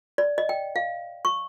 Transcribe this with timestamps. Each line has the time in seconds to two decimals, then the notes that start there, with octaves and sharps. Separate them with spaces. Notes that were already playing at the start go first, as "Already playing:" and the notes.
0.18 D5
0.38 D#5
0.49 G5
0.76 F5
1.25 C#6